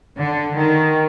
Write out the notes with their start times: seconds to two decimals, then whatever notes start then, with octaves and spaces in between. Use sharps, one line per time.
0.20 D3
0.57 D#3